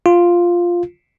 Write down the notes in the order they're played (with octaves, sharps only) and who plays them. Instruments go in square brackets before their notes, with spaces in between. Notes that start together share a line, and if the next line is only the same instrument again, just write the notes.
[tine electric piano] F4